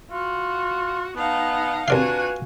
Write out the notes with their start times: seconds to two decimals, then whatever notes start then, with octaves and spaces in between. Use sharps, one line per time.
0.11 F4 F#4
1.16 B3 D#4 F5 F#5 A5
1.88 C2 D4 F4 F#4 B4 D5 F5 G#5